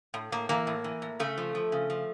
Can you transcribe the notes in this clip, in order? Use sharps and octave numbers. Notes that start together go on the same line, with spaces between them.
A2
A2 A#3
E3 A#3
A2
E3
A2
C#3 A3
F3
F3
C#3
F3